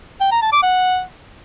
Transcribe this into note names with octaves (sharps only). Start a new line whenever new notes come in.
G5
A#5
A5
D6
F#5